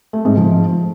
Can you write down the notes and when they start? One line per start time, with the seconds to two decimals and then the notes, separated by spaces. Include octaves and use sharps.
0.13 A3
0.25 G#2
0.37 F3